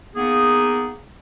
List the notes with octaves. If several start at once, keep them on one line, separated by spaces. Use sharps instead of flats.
A#3 B3 D#4 G#4